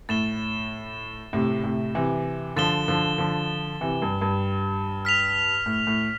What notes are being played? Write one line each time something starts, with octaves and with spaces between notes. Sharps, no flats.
A2 A6 E7 G7
A2 C3
A2 C3
C3 E3
D3 F3 A6 E7 G7
D3 F3
D3 F3
C3 E3
G2
G2
F6 B6 F7
A2
A2